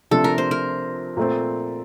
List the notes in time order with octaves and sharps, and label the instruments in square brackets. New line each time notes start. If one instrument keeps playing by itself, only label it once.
[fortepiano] C3 F3 A3 D4 [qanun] A4
[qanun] A#4
C5
A#4
[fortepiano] A#2 A3 C4